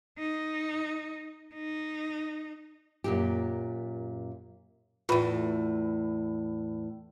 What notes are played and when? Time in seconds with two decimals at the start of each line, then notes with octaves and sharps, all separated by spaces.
0.18 D#4
1.54 D#4
3.04 F#2 A#2 G4
5.09 E2 A2 F4 B4 B5